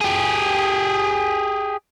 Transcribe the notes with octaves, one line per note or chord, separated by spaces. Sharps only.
G4 G#4